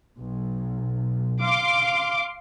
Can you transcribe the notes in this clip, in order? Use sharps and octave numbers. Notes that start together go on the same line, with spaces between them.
B1
F5 C6 D6